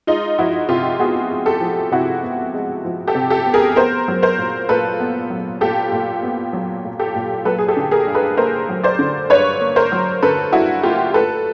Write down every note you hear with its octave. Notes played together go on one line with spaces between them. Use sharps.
G#3 D#4 F4
F3 E4 F#4
C3 F4 G4
B3 F#4 G#4
G#3
G4 A4
F3
C3 E4 F#4
B3
G#3
F3
G4 A4
C3
G4 A4
B3
G#4 A#4
B3 A#4 C5
F#3
A#4 C5
A#2
A#2 A4 B4
B3
F#3
A#2 G4 A4
A#2
B3
F#3
A#2
G4 A4
A#2
F#3 A4 B4
G#4
G4 A4
D3
G#4 A#4
G2
A4 B4
A#3 A#4 C5
F#3
C5 D5
D3
G2 B4 C#5
A#3
A#4 C5
F#3
D3 A4 B4
G2 E4 F#4
A#3 F4 G4
A3 A4 B4